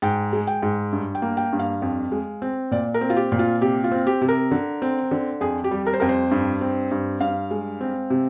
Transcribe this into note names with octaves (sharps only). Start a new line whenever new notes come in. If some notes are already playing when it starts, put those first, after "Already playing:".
G#2 G5
G#3
G5
G#2
G2
G5
A#3
G5
G2
F5
F2
G#3
C4
A#2 D5
A#4
C4
F4
G4
A#2
F4
C3 G4
F4
C4
G4
C3
A#4
D3
C4
D3
F2 G#4
G4
G3
A#4
C5
F2 A#4
C5
G2
C4
G2
G2 F5
G#3
C4
C3